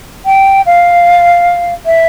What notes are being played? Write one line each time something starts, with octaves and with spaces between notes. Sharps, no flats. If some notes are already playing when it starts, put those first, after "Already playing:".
G5
F5
E5